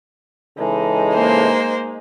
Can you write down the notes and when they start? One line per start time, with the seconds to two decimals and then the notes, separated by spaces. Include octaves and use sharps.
0.58 C#3 E3 G#3 D#4 A4
1.14 A#3 C5